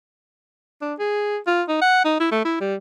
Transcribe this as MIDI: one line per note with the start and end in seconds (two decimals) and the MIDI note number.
0.81 0.94 62
0.99 1.38 68
1.47 1.62 65
1.68 1.80 63
1.81 2.02 78
2.05 2.18 63
2.20 2.28 64
2.32 2.44 57
2.45 2.56 64
2.60 2.75 55